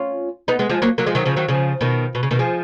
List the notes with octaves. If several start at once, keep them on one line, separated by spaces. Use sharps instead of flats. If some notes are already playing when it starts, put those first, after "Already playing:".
Already playing: C#4 F4
B3 D#4
G#3 B3
F3 G#3
F#3 A#3
F#3 A#3
F3 G#3
D#3 F#3
C#3 F3
D#3 F#3
C#3 F3
B2 D#3
B2
C#3
B2 D#3
F3 G#3